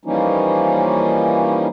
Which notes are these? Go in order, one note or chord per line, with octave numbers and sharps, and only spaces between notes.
E3 F3 G3 A#3 C#4 D#4